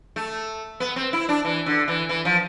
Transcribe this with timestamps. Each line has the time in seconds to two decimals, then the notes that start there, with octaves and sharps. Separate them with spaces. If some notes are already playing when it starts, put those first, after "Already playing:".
0.16 A3
0.80 B3
0.96 C4
1.13 E4
1.29 D4
1.45 E3
1.66 D3
1.88 E3
2.09 E3
2.25 F3